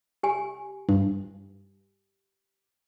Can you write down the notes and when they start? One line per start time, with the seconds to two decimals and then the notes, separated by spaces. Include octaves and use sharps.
0.23 G4 G#5
0.89 G2